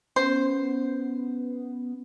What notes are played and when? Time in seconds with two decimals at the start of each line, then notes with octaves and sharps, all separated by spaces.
0.16 B3 C#4 C5